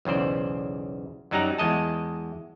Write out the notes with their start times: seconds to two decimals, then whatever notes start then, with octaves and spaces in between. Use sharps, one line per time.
0.05 B1 E2 C#3 C5 D5
1.31 F#2 F#3 G3 D#4 F#5 A#5
1.58 E2 G#3 D#5 A5